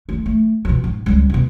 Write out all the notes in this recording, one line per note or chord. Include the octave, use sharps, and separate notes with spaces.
D#3 A3
A3
B2 F3
G#2
C#2 G3
E2 B2